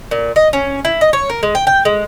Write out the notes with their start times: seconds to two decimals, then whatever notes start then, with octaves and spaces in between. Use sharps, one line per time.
0.11 A#2
0.36 D#5
0.53 C#4
0.85 E4
1.01 D#5
1.13 C#5
1.30 A#4
1.43 G#3
1.55 G5
1.67 G5
1.85 G#3